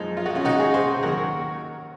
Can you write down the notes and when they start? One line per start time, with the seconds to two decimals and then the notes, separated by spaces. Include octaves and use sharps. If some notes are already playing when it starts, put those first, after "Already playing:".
Already playing: F#2 F3 G#3 D#4
0.17 F4
0.26 F#4
0.35 C#4 F4
0.45 C#2 C#3 G#3 D#4 F#4
0.60 F4 G#4
0.74 G#4 C5
1.03 D#2 D#3 F#3 F#4 A#4